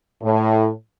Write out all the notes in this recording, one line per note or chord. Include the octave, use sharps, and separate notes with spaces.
A2